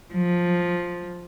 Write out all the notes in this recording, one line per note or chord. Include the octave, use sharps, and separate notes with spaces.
F3